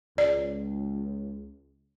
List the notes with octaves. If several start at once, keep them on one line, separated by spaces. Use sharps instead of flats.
C#2 D5